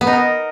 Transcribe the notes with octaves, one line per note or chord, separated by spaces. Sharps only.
B3
D#4
A#4